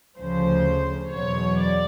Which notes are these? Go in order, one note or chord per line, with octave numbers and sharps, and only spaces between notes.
D2 C#3 F3 C5
E2 B2 F#3 C#5
D5